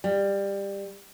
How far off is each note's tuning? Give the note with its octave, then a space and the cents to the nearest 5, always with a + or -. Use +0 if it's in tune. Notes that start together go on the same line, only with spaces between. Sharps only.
G3 +15